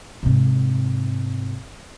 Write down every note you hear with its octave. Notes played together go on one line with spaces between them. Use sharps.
G#2 C3